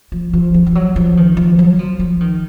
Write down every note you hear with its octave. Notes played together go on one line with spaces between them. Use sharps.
F3
F3
F3
F3
F#3
F3
D#3
F3
F#3
F3
F3
D#3